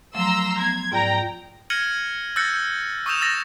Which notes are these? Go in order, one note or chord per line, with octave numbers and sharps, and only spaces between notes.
F3 F#3 A3 A#5 C6 E6
B3 G#6
G#2 F4 D5 G5 A#5
F6 G#6 A#6 C#7 D#7 F#7
E6 F#6 G6 A6 A#6 C#7
C#6 D#6 E6 G6 E7 F7
E6 A6 A#6